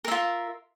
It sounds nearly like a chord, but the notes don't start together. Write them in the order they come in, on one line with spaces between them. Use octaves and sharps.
A#4 E5 F4